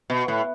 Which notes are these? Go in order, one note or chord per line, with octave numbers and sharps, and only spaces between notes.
B2
A2